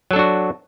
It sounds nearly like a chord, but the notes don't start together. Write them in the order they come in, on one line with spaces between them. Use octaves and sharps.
F#3 A4 D4 F#4